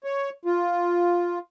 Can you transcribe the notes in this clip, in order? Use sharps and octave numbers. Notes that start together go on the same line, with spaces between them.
C#5
F4